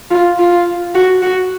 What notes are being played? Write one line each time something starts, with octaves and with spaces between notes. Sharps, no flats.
F4
F4
F#4
F#4